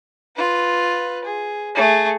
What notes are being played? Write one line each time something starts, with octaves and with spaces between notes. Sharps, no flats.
F4 B4
G#4
A3 G#4